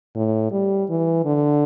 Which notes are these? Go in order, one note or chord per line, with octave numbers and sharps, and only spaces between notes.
A2
G3
E3
D3